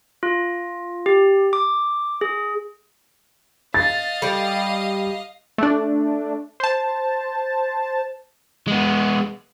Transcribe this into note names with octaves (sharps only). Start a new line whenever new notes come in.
F4
G4
D6
G#4
D#5 F5 A6
G3 D5
A3 D4
C5 A5
G#3 B3